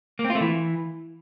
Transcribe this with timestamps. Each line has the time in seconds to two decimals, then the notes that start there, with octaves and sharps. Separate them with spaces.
0.19 A#3
0.24 C4
0.30 F4
0.35 A3
0.41 E3